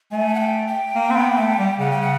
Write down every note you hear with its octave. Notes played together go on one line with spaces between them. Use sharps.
A3 G#5
F#5
G5
G5
A#3
C4
B3
A#3
A3
G3
C#3 F#5
G5
F#5